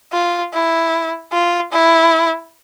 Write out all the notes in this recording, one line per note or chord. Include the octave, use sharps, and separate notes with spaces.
F4
E4
F4
E4